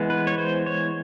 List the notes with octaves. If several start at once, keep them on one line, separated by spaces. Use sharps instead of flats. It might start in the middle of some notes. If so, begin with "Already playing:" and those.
Already playing: E3 G#3 B3
B4
C#5
C5
C#5